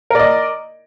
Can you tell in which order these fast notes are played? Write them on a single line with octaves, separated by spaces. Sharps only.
A#4 D5 D#5